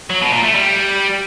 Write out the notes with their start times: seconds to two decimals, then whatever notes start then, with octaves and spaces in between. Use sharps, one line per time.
0.10 F#3
0.22 B2
0.33 A#2
0.44 A3
0.55 G3